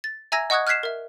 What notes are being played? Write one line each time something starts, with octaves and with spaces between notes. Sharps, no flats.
A6
E5 G#5 A#5 E6 G#6 A#6
D#5 F#5 C#6 D#6 F#6 G#6
F6 F#6 G#6 B6 C7 E7
A#4 E5